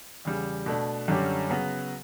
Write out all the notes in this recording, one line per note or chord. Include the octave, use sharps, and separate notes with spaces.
E2 C#3 G3
B2 A3 D4
F#2 D3 G3 C#4 G4
C#3 F#3 B3 F#4